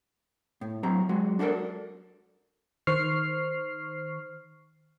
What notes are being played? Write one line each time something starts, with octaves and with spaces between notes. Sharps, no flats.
A2
A2 F#3 C4 A#5
F#3 G#3 F#4
D4 F#4 A4 A#4 D5
D#3 C5 C#6 F6 C7